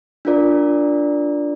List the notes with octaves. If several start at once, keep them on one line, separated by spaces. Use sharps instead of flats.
D4 F4 A#4 D5